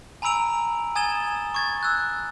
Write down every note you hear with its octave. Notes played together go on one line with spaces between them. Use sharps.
G#5 A#5 B5 E6 D7 F7
G#5 D#6 G#6 A6 E7 G7
C#6 G#6 A6
E6 F#6